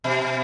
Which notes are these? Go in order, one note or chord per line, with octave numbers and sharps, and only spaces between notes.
B2